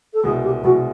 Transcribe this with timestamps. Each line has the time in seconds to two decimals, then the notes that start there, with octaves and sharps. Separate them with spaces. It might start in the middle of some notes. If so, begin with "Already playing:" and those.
0.14 A4
0.23 C2 B2 G#3 G#4
0.43 G4
0.64 C2 B2 G#3 F#4